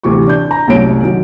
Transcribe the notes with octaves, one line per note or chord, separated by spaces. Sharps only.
D2 C3 E3 C#6 D6
D4 G6
A#5
C2 F#2 A3 C#5 D7
D#3 F#3